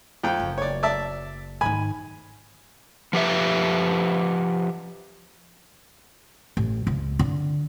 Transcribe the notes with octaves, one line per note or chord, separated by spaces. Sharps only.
F2 G5
F#1
C#5 D5
D5 E5 A5
G#2 D#3 G#5 B5
F3 G4 B4 E5
A1
C#2
D3